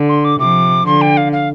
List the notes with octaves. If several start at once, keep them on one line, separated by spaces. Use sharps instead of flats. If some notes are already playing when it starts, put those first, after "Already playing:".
Already playing: D3
C6
D6
C3 F3 D6
D3 C6
G5
F5
F5